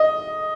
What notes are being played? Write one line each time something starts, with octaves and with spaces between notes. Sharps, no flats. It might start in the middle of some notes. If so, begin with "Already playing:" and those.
Already playing: D#5